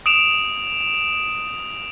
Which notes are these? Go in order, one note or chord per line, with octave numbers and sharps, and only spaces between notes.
D#6 D7 E7 F7